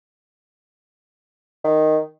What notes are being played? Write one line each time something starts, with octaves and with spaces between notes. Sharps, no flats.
D#3